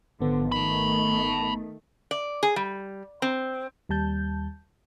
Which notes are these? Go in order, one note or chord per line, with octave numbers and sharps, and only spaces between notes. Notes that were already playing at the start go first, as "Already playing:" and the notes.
G#1 D3 F3 B3
D#3 A3 A5 B5
D5
G#4
G3
C4
D#2 G3 A5 G6